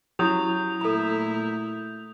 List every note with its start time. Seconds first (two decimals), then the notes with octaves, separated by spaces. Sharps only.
0.19 F#3 C#4 E4 G4 D#6 G6 F7
0.81 A#2 A3 E4 A4 A#5